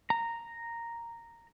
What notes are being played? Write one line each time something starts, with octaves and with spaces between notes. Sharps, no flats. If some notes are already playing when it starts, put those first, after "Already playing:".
A#5